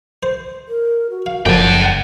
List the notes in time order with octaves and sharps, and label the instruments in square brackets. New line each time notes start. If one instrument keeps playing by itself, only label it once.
[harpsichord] C5
[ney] A#4
F#4
[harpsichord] F5
[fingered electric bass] F#1 [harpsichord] F2 A#2 D6 [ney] F#5 [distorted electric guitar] G5 A5